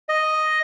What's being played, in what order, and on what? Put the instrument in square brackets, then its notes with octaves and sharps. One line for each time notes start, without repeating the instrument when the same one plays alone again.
[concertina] D#5